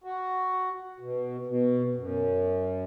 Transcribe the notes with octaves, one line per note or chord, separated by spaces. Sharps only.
F#4
B2
B2
F#2